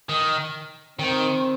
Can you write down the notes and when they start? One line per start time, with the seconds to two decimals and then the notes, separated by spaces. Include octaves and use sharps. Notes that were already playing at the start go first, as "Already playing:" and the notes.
0.09 D#3
0.99 D#3 C4